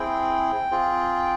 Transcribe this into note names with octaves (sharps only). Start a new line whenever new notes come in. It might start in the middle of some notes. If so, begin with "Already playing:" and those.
Already playing: C4 E4 G#4 G5
C4 F4 G#4